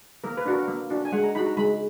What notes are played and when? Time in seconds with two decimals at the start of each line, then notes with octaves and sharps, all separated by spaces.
0.24 A#3 A#4
0.37 B4
0.46 D4 F#4 A#4
0.68 A#3
0.90 D4 F#4
1.05 G#5
1.12 G#3 F#5
1.24 A#5
1.35 D#4 F#4 B5
1.46 A#5
1.57 G#3 B5